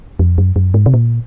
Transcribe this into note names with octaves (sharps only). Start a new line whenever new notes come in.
F2
F#2
F#2
G#2
C3
A#2